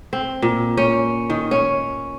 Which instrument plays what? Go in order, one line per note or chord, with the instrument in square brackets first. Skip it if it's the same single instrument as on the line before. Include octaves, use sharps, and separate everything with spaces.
[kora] C4
A#2
C#4
D#3
C#4